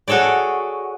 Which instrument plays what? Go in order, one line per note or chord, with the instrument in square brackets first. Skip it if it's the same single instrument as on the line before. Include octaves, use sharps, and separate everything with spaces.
[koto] F#4 G#4 A4 C#5 D5